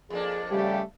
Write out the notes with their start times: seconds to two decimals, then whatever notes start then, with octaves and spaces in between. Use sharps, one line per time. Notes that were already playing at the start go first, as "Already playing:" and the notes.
0.10 F2 A#3 D4 G#4
0.51 C#3 G3 A3 G4